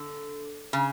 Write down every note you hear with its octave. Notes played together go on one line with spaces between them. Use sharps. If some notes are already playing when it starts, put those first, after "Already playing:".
Already playing: D3
C#3